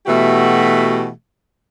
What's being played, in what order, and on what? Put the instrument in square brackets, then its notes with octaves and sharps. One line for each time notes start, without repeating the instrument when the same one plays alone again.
[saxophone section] B2 E3 A3 F#4 G4